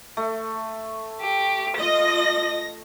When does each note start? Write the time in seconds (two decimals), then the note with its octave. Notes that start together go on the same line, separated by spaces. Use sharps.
0.17 A3
1.21 G4
1.77 F4 D#5 A#6